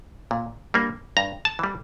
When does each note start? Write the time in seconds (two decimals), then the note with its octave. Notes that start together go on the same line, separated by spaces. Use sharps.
0.31 A#2
0.74 G3 A#3 D4
1.17 G2 A#5
1.45 A5
1.59 E3 G3